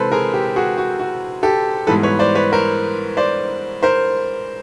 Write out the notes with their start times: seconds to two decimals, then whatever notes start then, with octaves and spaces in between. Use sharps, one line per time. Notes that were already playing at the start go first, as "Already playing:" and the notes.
Already playing: C3 E3 G#3 A4 B4 C5
0.12 G#4 A#4
0.34 G4
0.56 F#4 G#4
0.78 F#4
0.99 F#4
1.43 G4 A4
1.87 G#2 E3 G3 B3 A4 B4
2.03 B4 C#5
2.19 C5 D5
2.35 B4 C#5
2.52 A#4 C5
3.17 C5 D5
3.83 A#4 C5